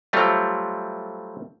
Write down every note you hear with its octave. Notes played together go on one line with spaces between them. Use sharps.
F#3 G3 A3 C4 F4